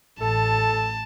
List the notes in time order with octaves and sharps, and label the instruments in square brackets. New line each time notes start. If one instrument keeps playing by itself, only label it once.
[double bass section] A1 [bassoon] A4 [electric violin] A5